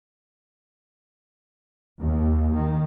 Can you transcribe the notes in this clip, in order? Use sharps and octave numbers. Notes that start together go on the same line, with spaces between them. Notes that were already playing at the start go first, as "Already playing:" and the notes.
D#2
D#3